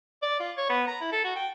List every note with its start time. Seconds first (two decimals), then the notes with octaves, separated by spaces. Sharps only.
0.23 D5
0.40 F4
0.57 C#5
0.70 B3
0.88 A#5
1.01 E4
1.12 A4
1.25 F#4
1.36 G5